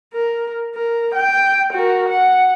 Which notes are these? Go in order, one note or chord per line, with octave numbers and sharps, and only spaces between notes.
A#4
A#4
G5
F#4 A#4
F#5